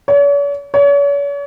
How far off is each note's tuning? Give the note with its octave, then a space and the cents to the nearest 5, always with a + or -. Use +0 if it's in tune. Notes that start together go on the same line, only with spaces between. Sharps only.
C#5 +45
C#5 +40